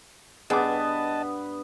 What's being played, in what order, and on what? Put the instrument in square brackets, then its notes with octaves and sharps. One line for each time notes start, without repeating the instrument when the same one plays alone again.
[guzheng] G2 [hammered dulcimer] B3 [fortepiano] G#4 D6 [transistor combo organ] D#5 A5